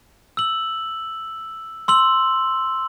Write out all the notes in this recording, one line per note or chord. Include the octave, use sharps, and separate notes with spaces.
E6 F#7
C6 E6 F#7